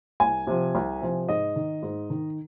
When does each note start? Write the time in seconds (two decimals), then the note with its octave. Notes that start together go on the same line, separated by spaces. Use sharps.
0.20 C2 G#5
0.47 C3 F3
0.75 C2
1.02 C3 F3
1.28 G#2 D#5
1.56 D#3
1.82 G#2
2.10 D#3